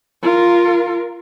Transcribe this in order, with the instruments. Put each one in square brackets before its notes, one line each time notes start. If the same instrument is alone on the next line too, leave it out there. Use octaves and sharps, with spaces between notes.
[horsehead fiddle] F4 A#4